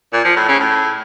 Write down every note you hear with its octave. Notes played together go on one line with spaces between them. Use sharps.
A#2
F3
A2
C#3
A2